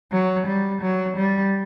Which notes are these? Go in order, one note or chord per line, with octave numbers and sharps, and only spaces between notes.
F#3
G3
F#3
G3